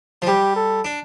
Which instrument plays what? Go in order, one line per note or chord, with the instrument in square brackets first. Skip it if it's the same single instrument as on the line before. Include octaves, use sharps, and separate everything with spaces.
[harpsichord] F3
[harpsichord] G3 [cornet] G4
[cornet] A4
[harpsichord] D4